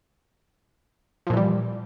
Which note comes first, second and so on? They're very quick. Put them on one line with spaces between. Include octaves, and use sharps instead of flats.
F3 A#2 E3 G3